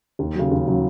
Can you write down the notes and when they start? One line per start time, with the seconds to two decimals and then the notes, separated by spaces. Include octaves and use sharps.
0.19 D#2
0.35 C#3 F#3
0.51 D#2
0.68 C#3 F#3